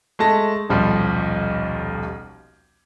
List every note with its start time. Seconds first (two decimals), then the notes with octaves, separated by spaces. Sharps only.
0.19 G#3 A3 A5 A#6
0.69 D#1 B1 F3 G3